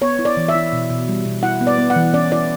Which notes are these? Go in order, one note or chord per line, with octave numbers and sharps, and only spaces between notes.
B3 C#5
E4
D5
E3
E5
E4
B2
B2
G3
B2
E4 F#5
B3
D5
B3
F#5
E3
C#4 D5
E4 D5